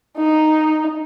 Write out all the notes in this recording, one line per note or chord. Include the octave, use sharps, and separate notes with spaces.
D#4